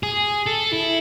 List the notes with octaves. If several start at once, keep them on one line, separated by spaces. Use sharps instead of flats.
G#4
A4
E4